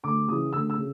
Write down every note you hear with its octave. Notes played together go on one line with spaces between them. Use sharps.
D2 D6
C#3 E3 D#6
D2 E6
E6
C#3